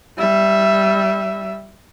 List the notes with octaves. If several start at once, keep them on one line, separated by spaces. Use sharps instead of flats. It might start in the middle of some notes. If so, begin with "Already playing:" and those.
G3 E5